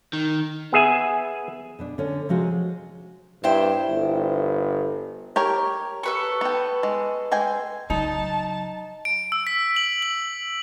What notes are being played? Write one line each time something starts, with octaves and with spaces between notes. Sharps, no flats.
D#3
B3 G#4 E5 G#5
B2 B3 D4
D3 C#4
C3 F3 G#3 F#4 G#4
G2 E4 C5 G5
G1
G4 A#4 C#5
A4 B4 C#6
B3 G5
G#3
G#3 G5 G#5
C#3 F#3 D#4 A5
D7
E6
B6
F#7
F#7